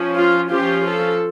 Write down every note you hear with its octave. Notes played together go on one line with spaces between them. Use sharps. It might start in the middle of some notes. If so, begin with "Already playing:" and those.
Already playing: F3 C#4
F4
F3 C#4 F4 G4
A4